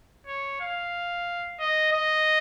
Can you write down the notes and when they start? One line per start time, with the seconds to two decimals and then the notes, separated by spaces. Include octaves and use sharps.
0.27 C#5
0.60 F5
1.60 D#5
1.92 D#5